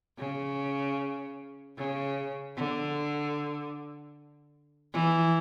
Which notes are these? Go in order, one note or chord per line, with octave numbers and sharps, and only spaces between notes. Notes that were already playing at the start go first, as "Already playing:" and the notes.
C#3
C#3
D3
E3